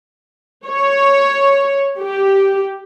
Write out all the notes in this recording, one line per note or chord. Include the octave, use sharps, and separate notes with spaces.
C#5
G4